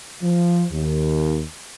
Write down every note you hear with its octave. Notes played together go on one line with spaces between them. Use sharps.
F3
D#2